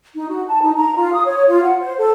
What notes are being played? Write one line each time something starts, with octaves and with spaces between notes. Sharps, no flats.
D#4
F#4
A5
D#4
A#5
F4
D#6
C#5
F4
F#5
C5
A4